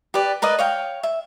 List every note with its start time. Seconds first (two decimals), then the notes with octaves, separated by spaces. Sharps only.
0.14 G4 B4 D5
0.42 A#4 B4 D5 D#5
0.59 C#5 F5 G5
1.03 E5